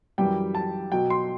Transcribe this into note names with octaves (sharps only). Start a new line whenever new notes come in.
F#2 E3 G3 G5
A5
B2 F#3 G5
C6